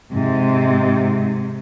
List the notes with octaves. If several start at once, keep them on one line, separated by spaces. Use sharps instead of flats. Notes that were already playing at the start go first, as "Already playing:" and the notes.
G#2 C3